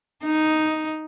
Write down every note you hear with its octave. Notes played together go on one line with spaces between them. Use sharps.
D#4